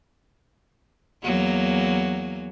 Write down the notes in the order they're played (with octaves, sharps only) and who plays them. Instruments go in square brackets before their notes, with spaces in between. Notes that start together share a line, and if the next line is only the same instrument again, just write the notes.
[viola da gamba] E2 F#3 A#3